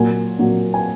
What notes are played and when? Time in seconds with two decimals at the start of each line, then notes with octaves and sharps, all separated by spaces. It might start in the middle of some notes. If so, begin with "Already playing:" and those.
Already playing: A#2 F#3 A#3 G#5
0.39 A#2 F#3 A#3
0.74 G#5